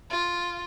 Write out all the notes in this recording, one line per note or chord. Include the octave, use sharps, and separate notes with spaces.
F4